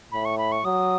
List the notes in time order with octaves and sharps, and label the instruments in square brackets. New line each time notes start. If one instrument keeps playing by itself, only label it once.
[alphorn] A2 [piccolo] B5
[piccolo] C#6
B5
C#6
[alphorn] F#3 [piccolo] D#6